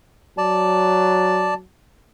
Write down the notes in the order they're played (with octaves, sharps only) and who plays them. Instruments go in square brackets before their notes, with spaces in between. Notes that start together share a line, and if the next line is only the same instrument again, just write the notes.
[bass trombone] F#3 [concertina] D5 A5